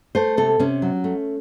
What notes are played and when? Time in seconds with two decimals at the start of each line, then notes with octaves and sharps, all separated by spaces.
0.15 A3 C5
0.37 C3 A4
0.60 C3 C#4
0.82 F#3
1.04 A3